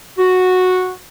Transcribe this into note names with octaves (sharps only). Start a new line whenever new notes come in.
F#4